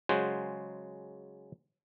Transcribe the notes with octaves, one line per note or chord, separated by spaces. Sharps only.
C#3 F#3 G#3 F#4 C5